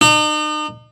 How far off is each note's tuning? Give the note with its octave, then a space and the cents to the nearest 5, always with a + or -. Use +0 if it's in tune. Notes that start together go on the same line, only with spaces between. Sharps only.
D#4 -40